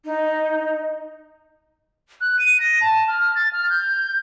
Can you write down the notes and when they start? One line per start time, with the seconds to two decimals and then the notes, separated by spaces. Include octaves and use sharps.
0.05 D#4
2.21 F#6
2.39 D#7
2.60 A#6
2.81 A5
3.08 F6
3.35 A6
3.53 F6
3.70 G6